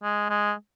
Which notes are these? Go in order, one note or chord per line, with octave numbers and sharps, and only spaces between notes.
G#3
G#3